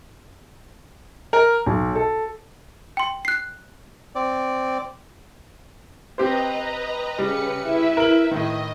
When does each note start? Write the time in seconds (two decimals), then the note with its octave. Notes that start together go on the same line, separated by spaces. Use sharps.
1.33 A#4
1.66 B1
1.95 A4
2.97 G5 C6
3.25 F#6 C7
4.15 C4 D5
6.18 C4 G4 B4 C5 D#5 A#5
7.19 C#3 G3 B4 C#7
7.62 E4 B4 E5
7.97 A#4 F#7
8.31 A2 D#3 D#5